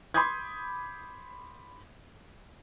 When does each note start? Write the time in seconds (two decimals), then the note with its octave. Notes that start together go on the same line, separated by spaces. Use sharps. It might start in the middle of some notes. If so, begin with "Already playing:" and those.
0.14 B5 C6 D6 D#6 G6 G#6